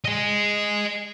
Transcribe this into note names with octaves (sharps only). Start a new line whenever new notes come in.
D#5 G#5